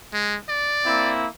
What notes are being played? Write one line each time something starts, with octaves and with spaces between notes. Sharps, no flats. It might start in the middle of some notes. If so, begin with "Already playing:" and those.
G#3
D5
A#3 C4 E4